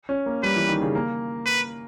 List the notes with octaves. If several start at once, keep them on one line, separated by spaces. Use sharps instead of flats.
C#4
A#3
G3 B4
E3
D#3
C#3
A#3
B4